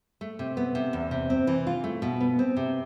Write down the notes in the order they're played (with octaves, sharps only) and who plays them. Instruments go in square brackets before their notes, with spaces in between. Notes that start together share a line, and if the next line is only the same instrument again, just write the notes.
[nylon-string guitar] A3
C3
B3
C3
E2
C3
C4
E3
F4
A3
B2
B3
C4
C3